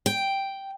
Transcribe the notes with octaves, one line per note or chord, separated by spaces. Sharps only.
G5